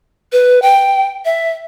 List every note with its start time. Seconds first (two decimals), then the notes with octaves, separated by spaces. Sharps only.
0.32 B4
0.62 G5
1.25 E5